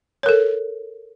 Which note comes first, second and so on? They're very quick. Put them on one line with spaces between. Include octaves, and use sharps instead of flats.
C#5 A#4 A4